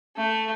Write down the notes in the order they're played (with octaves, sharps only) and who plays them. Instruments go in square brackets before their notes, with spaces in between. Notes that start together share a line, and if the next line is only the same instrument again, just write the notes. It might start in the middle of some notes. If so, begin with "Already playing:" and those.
[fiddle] A3